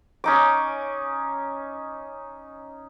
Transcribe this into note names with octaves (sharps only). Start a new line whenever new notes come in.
C#4 D#4 D6